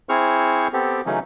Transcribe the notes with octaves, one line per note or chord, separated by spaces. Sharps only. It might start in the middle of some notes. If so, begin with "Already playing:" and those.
C4 E4 G#4 C5 C#6 F6
B3 C4 G4 A4
C#3 E3 F#3 A3 C#4 D#4